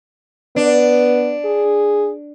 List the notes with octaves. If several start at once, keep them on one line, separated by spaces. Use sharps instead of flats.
B3 D4
G#4